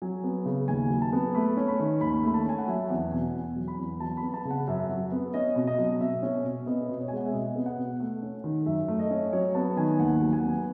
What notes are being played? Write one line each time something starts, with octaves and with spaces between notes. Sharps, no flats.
F#3 G#5
B3
C#3
D#2 G#5
F#3
A5
B3
A3 B5
C#4
B5
D#3
D#2 B5
A3 B5
A5
C#4 G#5
F#5
F#3 E5
E2 F#5
B2 G#5
E2 G#5
F#3
B5
E2
F#3 A5
B5
B3
A5
C#3
F#5
F#2 E5
F#3
B3
C#4 D#5
B2
D#5
F#3
B2 E5
C#4
B2
B3 D#5
B2
C#5
G#5
G#3
F#5
E5
B2 D#5
B3
F#5
B2
A3 F#5
C#4
D#3
F#2 E5
A3
D#5
C#4
F#3 C#5
B3 A5
D#3 G#5
D#2 F#5
F#3
G#5
B3